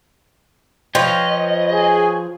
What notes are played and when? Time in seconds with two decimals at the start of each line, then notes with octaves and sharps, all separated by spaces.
0.95 F3 B4 C#5 D#5 G5
1.71 G#4